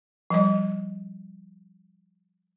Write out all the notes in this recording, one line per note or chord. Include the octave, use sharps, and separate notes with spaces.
F3 G3 D#5